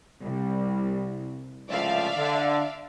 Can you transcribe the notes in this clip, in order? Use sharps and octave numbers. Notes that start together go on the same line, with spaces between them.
C2 G3
C#2 A2 F3 D5 E5 F5
D3